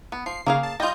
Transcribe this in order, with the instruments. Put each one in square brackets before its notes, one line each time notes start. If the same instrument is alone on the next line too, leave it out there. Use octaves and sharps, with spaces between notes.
[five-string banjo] B3
[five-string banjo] F3 [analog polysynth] C7
[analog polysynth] C#3 [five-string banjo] A#3 G#4 F5
[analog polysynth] A5
[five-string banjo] G3 F4 [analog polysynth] D#5 G6